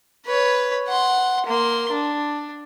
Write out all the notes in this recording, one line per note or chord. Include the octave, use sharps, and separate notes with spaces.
B4 C#5
F#5 C6
A#3 C6
D4